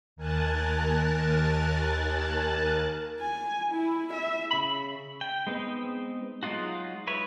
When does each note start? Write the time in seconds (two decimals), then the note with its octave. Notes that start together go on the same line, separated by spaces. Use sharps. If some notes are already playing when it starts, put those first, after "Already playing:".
0.16 D#2 A#4 G#5 A5 F#6 A6
3.21 G#5
3.72 E4
4.13 E5
4.51 C#3 B5
5.21 G5
5.47 G#3 B3 C4 D#4
6.43 F#3 G#3 D#4 F4 F#4
7.07 E4 B4 C#5